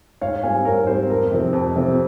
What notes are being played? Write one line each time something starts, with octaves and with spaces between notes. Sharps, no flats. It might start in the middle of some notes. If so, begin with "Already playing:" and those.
G#2 C#5 F5
G3 C4 F5 G#5
G#2 A#4 C#5
G3 C4 C5
F2 A#4
C3 F3 C4
F2
C3 F3 C4